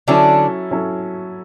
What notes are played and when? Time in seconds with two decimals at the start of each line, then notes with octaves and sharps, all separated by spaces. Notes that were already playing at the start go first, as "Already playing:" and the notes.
0.08 D3 F#3 C#4 D4 E4 A4
0.71 F#3 C#4 E4 A4